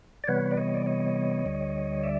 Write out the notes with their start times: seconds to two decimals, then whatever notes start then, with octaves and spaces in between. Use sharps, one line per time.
0.24 D5
0.28 C3 E3 G3 B3 B4 C#5
0.51 D5
0.57 C#5 D#5
0.74 D5
0.86 C#5 D#5
1.45 D2 D3 G3
2.03 D5 E5